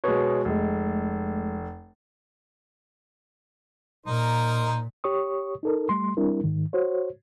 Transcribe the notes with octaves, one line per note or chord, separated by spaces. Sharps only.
B2 G#3 B4 C#5
F1 G#3 A3
A#2 D#4 A#4 C5
G4 C#5 C#6 D#6
D#4 A4 A#4
G3 A3 C6
G3 C4 D4 E4 A#4
G#2 D#3
F#4 C5 C#5